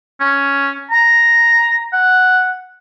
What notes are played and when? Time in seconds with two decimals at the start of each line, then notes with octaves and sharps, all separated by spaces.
0.20 C#4
0.91 A#5
1.93 F#5